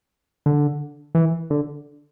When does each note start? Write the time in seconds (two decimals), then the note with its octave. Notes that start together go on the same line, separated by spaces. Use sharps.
0.46 D3
1.15 E3
1.50 D3